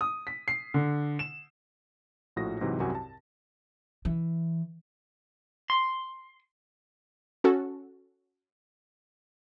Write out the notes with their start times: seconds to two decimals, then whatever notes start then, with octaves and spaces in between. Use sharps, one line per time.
0.01 D#6
0.27 B6
0.48 C7
0.74 D3
1.19 E7
2.36 A#1 A2 F3 F#4 D#6 A#6
2.61 G#2 C3 E3 F#3
2.80 C2 F#2 C4 F#4 G4 G#5
2.95 A5
4.05 E3
5.70 C6
7.44 C#4 F#4 A4